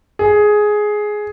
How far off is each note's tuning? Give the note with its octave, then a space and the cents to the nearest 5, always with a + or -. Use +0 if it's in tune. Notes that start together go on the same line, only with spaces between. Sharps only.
G#4 +10